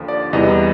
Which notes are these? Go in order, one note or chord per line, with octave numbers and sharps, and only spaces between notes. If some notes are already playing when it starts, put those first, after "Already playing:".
Already playing: D#2 D3 F3
D5
E2 C3 E3 G3 D#5